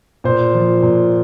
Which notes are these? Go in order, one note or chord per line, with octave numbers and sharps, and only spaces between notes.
A#2 C5
F3
A#2